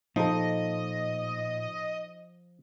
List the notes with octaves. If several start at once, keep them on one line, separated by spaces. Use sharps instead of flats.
A#2 F3 D#4 A4 D#5